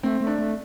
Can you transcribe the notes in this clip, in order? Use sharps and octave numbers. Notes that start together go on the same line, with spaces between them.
A3 C4
A3
D4
A3